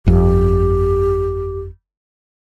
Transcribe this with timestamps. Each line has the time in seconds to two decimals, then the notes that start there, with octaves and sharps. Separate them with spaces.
0.06 G1 F2 G4